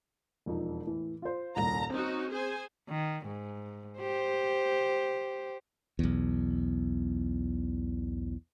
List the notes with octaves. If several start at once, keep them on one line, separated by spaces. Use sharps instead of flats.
E1 F2 D#4
A2 E3
F4 C5
D#1 C2 A#5
C4 C#4 D#4 F#4
G#4 C5 G#5
D#3
G#2
G4 C5
B1 E2